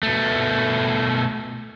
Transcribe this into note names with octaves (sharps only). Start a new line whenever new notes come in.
B2 A3